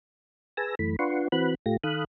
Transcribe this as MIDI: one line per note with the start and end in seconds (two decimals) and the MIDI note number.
0.57 0.75 68
0.57 0.75 71
0.57 0.75 80
0.57 0.75 81
0.57 0.75 88
0.57 0.75 94
0.79 0.96 42
0.79 0.96 52
0.79 0.96 57
0.79 0.96 83
0.99 1.28 62
0.99 1.28 65
0.99 1.28 71
0.99 1.28 78
0.99 1.28 84
0.99 1.28 85
1.32 1.55 52
1.32 1.55 60
1.32 1.55 66
1.32 1.55 71
1.32 1.55 83
1.32 1.55 90
1.66 1.77 45
1.66 1.77 57
1.66 1.77 65
1.66 1.77 67
1.66 1.77 94
1.84 2.04 51
1.84 2.04 69
1.84 2.04 77
1.84 2.04 83
1.84 2.04 87
1.84 2.04 90